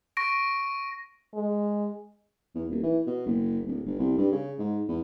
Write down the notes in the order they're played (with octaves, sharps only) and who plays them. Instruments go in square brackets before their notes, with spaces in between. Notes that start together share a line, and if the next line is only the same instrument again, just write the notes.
[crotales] C#6 A#6 D7
[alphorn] G#3
[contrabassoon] E2
D#1
E3
B2
F#1
D1
G1
C2
G2
C#3
G#2
E2